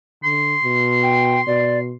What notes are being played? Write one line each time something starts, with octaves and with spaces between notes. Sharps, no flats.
D3 C6
B2
G5
B2 D5